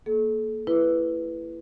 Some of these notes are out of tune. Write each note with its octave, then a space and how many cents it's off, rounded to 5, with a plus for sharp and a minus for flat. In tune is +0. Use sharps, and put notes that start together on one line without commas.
A#3 +0 A4 -35
E4 +20 B4 +0